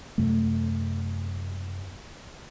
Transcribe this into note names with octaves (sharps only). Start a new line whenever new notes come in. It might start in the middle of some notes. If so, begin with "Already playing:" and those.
F#2 C3 A3